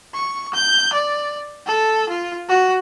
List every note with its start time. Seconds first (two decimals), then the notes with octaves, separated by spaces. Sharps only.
0.14 C#6
0.54 G6
0.93 D5
1.66 A4
2.09 F4
2.49 F#4